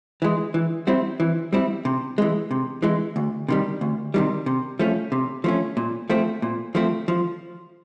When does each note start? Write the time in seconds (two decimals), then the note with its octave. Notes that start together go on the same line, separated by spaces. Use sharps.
0.22 E3 G#3
0.54 E3
0.87 G3 C4 E4
1.20 E3
1.53 G3 C4 E4
1.85 C3
2.18 E3 G#3
2.51 C3
2.82 E3 G#3
3.16 D2
3.48 C3 D#3 G3
3.81 D2
4.14 C3 D#3 G3
4.46 C3
4.79 F3 A3 C#4
5.12 C3
5.44 F3 A3 C#4
5.77 A#2
6.10 F3 A3 C4
6.42 A#2
6.75 F3 A3 C4
7.08 F3